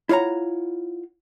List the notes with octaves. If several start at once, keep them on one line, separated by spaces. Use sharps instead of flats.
E4 F4 C#5 F#5 A#5